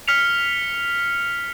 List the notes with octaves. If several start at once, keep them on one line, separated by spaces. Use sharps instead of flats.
F6 B6 C#7 F7